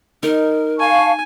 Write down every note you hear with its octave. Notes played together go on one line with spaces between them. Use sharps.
D#4 A#4
F5 G#5 A5 C#6